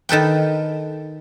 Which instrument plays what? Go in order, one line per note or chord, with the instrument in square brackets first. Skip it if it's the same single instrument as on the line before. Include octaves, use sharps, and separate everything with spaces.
[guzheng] D#3 A4 B4 G5